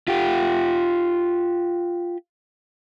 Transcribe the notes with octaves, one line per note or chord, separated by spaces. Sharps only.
F4 G4